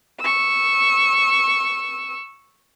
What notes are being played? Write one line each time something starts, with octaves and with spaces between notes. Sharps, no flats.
C#6 E6